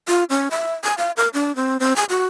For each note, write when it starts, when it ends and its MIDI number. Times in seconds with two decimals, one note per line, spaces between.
0.08 0.24 65
0.30 0.48 61
0.51 0.73 76
0.84 0.94 80
0.98 1.11 77
1.17 1.28 70
1.34 1.55 62
1.56 1.77 60
1.80 1.96 60
1.96 2.04 80
2.09 2.27 66